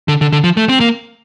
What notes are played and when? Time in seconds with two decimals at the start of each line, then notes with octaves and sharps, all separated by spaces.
0.08 D3
0.21 D3
0.32 D3
0.44 F3
0.57 A3
0.69 C4
0.80 A#3